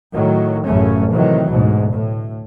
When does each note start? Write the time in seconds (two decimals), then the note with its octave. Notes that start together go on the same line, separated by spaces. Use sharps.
0.12 A2 D#3 F#3
0.64 A1 F#2 C#3 A3 C#4
1.12 A2 C3 D#3 E3 F#3
1.50 D2 G#2 B2
1.93 A2